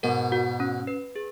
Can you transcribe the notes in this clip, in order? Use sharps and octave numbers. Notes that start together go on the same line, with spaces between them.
G#2 B2 A#4
F#4
C#4
B4
G#4